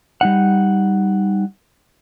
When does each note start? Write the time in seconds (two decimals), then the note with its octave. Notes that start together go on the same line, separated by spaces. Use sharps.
0.21 G3 D#4 F#5